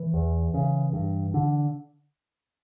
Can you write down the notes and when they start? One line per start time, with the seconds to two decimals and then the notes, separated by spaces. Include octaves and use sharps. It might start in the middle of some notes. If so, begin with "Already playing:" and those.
Already playing: E3
0.14 E2
0.54 C#3
0.93 G2
1.34 D3